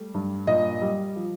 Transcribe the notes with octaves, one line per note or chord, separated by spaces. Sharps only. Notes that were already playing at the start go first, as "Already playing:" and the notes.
Already playing: G3 A3
G2
A#2 D#5
G3
F3